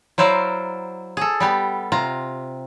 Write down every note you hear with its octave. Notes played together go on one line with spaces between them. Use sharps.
F#3 E4 C5 D5 F5 A#5
G#4 A4
G3 B3 G4
C3 F4 A#5